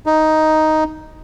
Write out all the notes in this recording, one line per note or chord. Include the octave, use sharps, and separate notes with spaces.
D#4